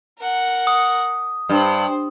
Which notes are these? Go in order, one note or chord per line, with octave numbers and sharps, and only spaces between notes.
A#4 F#5
D#6
G2 C5